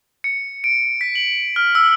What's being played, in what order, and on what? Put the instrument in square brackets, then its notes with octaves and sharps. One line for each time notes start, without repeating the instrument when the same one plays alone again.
[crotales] C#7
D7
B6
F#7
F6
E6